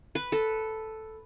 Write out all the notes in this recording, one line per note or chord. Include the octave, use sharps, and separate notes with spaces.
B4
A4